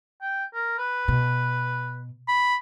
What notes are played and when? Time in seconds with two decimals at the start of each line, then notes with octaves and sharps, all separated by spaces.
0.21 G5
0.54 A#4
0.78 B4
1.08 B2
2.28 B5